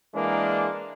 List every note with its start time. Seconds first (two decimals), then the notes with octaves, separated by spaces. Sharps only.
0.13 E3 G#3 A#3 D4 A#4